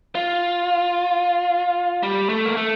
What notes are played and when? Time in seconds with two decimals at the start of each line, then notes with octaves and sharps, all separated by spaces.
0.15 F4
2.03 G3
2.29 A3
2.46 A#3
2.57 A3